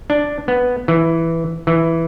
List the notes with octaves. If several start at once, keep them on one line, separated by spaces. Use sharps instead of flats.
D4
B3
E3
E3